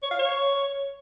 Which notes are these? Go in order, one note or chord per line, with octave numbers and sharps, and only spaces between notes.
C#5
F5
C#5